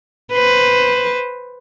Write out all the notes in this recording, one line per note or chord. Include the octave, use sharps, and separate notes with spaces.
B4 C5